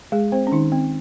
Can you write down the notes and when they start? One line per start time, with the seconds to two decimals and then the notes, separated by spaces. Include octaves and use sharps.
0.12 G#3 G#4
0.32 C4 C5
0.47 C#4
0.52 D#3 D#4
0.72 C4